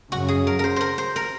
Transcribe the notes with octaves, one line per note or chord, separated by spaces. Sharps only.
F#2 C#3 F#3 F#4
G#4
A#4
A#4 C5
A#4 C5
C5
A#4